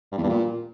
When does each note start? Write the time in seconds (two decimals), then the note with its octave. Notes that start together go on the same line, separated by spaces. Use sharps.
0.12 G2
0.18 E2
0.24 G2
0.29 A#2